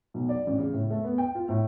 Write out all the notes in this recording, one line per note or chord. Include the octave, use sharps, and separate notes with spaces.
B1
D5
A1
C#3
A2
A3
B3
G5
F4
A2